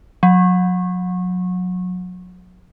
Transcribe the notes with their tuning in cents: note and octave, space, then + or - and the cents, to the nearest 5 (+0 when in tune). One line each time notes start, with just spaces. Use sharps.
F#3 -30